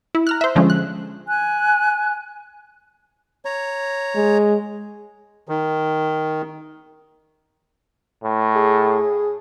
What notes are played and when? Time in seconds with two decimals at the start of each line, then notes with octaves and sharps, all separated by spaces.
0.15 E4
0.27 A#5 F6 F#6
0.41 C5 E5
0.55 D3 F3 G#3 C#4
0.70 F#6
1.28 G#5 F#6
3.45 C#5 A#5
4.16 G#3
5.49 D#3
8.23 A2
8.56 G#4